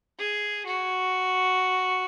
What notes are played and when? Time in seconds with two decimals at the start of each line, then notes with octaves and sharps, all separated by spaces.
0.19 G#4
0.66 F#4